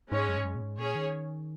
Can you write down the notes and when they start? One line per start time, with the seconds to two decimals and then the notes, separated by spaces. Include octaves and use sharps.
0.11 G#2 G#3 C#4 G#4 C#5
0.28 F#2
0.37 G#2
0.44 F#2
0.56 A#2
0.61 G#2
0.78 A#2 C#4 G#4 C#5
0.95 D#3